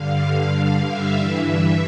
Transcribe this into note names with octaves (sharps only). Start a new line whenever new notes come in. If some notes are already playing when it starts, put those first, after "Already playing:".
Already playing: G2 D3 F5
F5
E5
G2 E3
E5